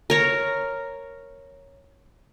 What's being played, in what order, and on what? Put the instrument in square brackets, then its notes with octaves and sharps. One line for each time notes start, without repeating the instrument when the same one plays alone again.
[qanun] A#4 C#5 A#5